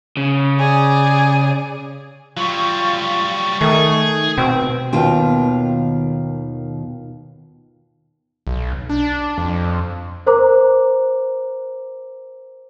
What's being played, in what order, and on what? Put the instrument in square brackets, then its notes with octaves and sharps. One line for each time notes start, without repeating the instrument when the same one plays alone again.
[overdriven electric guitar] C#3
[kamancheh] G#4 D5
[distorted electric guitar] F#3 G3 [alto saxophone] F4 [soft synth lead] C#6
[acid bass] D#3 [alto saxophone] A3 [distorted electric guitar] G#4
[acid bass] B2 [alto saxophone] C4
[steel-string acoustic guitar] D#2 B2 D#3 F4 G5
[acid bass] B1
D4
F2
[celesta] A#4 C5 A#5 D6